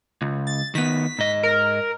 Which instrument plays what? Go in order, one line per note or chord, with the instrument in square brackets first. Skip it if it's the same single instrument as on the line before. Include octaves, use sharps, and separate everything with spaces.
[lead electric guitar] C#2
[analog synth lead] A6
[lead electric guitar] D#3 B3 [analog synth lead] B6
[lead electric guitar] G#2 D#5
[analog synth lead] A#4